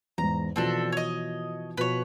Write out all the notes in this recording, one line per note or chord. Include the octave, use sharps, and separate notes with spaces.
E2 G#2 A#5
B2 E3 F3 C4 D4 A4
C#5 D#5
B2 F3 B4 C#5